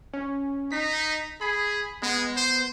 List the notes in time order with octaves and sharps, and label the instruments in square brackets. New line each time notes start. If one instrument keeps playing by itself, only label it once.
[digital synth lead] C#4
[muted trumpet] D#4 [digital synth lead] B6
[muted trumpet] G#4 [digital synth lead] B5
[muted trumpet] G#3 [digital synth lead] B3
[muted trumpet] C5